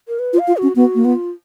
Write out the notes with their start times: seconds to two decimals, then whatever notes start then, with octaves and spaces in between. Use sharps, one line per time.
0.08 A#4
0.19 B4
0.33 F4
0.38 F5
0.47 F4
0.57 F#4
0.63 C#4
0.76 B3 F#4
0.95 A#3
1.05 B3 F4